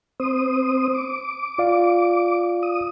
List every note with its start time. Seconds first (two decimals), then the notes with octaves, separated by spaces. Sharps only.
0.20 C4 C5 D#6
0.93 D6
1.58 F4 D5 F5
2.63 D#6